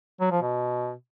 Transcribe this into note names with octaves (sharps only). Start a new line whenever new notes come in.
F#3
F3
B2